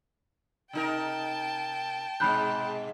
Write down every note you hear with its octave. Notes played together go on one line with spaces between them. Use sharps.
C3 D#4 A#4 G5 A5
G#2 B2 G#3 B5 F#6 G6